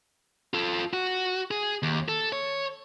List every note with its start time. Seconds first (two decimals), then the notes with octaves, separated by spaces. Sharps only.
0.54 F4 A4
0.93 F#4
1.51 G#4
1.83 D#2
2.08 A4
2.33 C#5